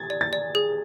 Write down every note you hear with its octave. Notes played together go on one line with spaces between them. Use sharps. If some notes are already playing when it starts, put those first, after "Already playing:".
Already playing: G#6 A6
D5
A6
D5
G#4